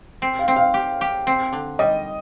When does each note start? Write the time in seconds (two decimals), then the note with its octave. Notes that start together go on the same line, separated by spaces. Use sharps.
0.22 C4
0.39 F5
0.48 C4
0.56 F5
0.74 G4
1.01 G4
1.27 C4
1.53 D3
1.79 G3 D#5